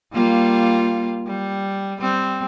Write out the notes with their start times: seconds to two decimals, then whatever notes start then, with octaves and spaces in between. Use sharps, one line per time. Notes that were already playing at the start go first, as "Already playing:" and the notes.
0.13 G3 A#3 F4
1.27 G3
2.01 G3 C4